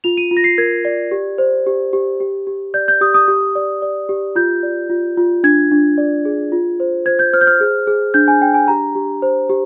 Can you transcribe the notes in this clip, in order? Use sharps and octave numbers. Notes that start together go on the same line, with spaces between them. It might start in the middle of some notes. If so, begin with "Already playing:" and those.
F4 F7
D#7
F4
A#6
C7
A#4 G#6
D5
G4
C5
G4
G4
G4
G4
D5 G6
G6
G4 D#6
D#6
G4
D5
D5
G4
F4 G6
D5
F4
F4
D4 G#6
D4
D5
G#4
F4
C5
C5 G#6
G6
C5 F6
G6
F6
G#4
G#4
D4 G6
G#5
D4 G5
G#5
G4 A#5
G4
C5
G4